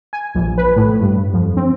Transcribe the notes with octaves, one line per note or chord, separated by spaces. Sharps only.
G#5
A#1
B4
A2
G2
F2
C4